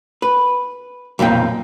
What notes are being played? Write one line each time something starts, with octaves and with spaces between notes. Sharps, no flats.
B4
B1 F2 A#2 G5